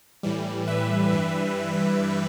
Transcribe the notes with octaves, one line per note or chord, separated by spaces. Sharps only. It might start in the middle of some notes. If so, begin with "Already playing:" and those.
A2 E3 G3
B4 E5
G2 E3 G3